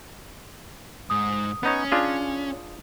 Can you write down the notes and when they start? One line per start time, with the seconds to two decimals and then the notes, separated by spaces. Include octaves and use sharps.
1.10 G#2 D#6
1.63 B3 C#4 D#4 C#5
1.92 D4 F4 G#4